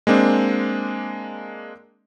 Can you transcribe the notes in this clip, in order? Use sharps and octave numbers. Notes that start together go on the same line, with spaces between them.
G#3 A#3 C4 D4